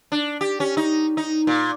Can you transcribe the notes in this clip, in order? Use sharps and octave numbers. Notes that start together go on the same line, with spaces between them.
D4
G4
C#4
D#4
D#4
A#2